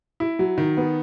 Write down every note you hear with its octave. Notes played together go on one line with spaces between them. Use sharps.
E4
F#3
D#3
B3